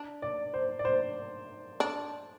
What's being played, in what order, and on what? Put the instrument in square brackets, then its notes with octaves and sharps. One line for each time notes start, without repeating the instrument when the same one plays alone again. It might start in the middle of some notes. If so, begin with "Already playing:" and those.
Already playing: [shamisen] D4
[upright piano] D5
C5
D5
C5
[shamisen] D4